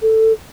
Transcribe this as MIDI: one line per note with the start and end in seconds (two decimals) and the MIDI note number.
0.02 0.32 69